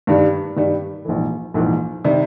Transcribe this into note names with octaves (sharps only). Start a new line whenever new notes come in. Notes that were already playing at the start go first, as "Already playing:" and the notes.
G2 D#3 G3
G2 D#3 G3
A#1 G#2 E3
A#1 G#2 E3
C3 D#3 G3